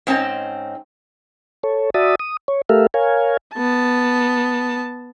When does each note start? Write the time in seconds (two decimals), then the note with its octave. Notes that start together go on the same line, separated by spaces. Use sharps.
0.07 G#2 C4 C#4 D#4 A5
1.63 A4 C#5
1.94 F#4 D5 E5 A5 B5 D#6
2.20 D#6
2.48 C#5
2.69 A3 G4 A4 A#4 E5 F5
2.94 A#4 C#5 F5 G#5
3.55 B3 A5